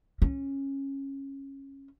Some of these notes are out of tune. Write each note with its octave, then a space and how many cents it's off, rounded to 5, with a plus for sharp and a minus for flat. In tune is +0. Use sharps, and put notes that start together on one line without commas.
C#4 -15